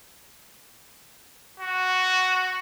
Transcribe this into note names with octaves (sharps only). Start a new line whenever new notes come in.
F#4